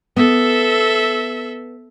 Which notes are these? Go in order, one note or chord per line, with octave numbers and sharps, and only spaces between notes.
B3 A4 E5